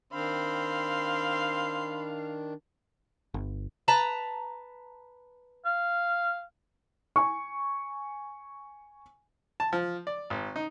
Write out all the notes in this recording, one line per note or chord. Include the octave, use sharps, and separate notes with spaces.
D#3 C4 D4 F5 B5 C6
G1
B4 A5 A#5
F5
G#5 C#6
A5
F3
D5
G#1
D#4